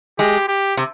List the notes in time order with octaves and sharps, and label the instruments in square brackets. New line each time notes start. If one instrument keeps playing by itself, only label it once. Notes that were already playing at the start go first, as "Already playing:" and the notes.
[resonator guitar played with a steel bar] G#3 [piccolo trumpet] G4
[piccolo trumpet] G4
[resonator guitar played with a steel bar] C3